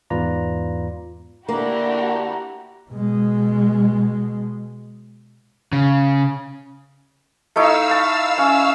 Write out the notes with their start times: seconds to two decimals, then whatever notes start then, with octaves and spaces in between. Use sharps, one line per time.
0.10 E2 G#2 F4 B4 D5 A#5
1.48 D3 A#3 D4 E4 F#4 G4 A#5
2.91 B2 G#3
5.73 C#3
7.56 A3 D#4 E4 F5 E6
7.91 A5
8.38 C#4